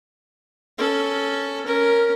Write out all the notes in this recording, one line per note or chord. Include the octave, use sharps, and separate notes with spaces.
C#4 A4
C#4 A#4